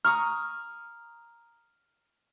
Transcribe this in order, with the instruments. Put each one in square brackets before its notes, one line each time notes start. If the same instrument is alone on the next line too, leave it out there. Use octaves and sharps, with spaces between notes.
[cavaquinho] A#5 C#6 D#6 [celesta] F6